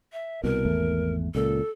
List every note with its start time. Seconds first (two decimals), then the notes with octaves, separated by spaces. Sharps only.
0.13 E5
0.43 C2 B2 A#4
0.65 G#1 E2 A3
1.35 C#2 A#2 A4